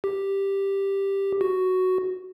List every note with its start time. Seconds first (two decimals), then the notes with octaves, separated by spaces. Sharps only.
0.04 G4
1.41 F#4